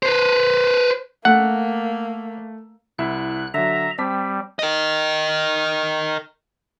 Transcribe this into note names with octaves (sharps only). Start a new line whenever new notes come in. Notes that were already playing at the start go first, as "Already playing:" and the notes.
B4 C5
A3 A#3 F#5
C2 E4 E5 F#6
D3 F#3 E5 A#5
G3 C4 A5 B6
A#4 D#5